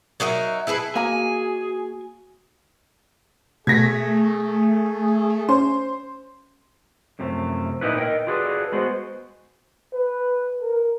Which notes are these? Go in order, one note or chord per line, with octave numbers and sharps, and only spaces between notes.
F#3 D#4 A#4 E5
E4 G#4 A4 B4
A#3 F#4 G#4 D#5 G#5 A#5
B2 A3 G#4 G#6 A#6 B6
C#4 C5
F#2 C3 F3 A3
A#2 D#4 E4 B4
A#4 D#5 G5
F4 F#4 G#4 A4 B4 D5
G#3 B3 F#4 G#4 C5
B4
A#4